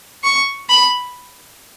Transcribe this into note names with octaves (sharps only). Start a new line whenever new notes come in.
C#6
B5